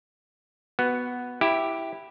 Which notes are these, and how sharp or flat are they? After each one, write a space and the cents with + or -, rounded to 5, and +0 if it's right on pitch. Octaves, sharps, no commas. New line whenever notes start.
B3 +0 F#4 +0
E4 +0 G4 +0